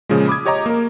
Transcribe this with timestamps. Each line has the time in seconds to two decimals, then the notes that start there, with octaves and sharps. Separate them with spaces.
0.09 A#2 C#3 F3 G#3
0.28 B5 D6 D#6 G#6
0.45 G4 C#5 D#5 A#5 D6
0.66 A#3 A#4